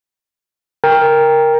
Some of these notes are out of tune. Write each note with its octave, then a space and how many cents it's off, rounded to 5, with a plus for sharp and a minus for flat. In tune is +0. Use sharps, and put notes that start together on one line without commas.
A#4 +0 G5 +20